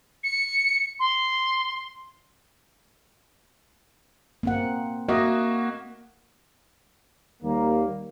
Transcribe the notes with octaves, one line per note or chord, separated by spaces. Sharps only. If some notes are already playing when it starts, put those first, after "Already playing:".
C#7
C6
A#3 C4 F#5
A#3 F#4 D#5 E5
D#2 G3 A#3